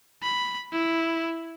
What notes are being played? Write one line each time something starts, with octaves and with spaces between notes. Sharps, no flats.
B5
E4